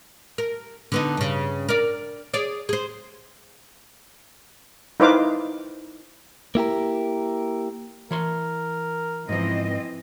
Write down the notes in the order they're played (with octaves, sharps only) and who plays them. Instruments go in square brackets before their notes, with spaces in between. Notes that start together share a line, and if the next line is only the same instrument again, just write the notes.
[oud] A#4
D3 B3 D#4
G2 C#3
A#4 D5
G#4 C#5 D5
G#4 C5
[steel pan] D#4 E4 B4 C5 F5 D6
[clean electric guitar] A#3 E4 G4 A#4
[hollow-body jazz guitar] E3 C#5 C6 [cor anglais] A#4
[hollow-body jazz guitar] G#2 F3 [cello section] E3 C4 D#5